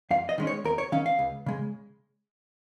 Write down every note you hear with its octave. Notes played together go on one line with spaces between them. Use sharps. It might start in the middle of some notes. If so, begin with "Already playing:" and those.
F2 F5
D#5
D#3 G#3 C#4
C#5
D#2 A#4
C#5
D#3 C#4 F5
F5
C#2
C#3 G#3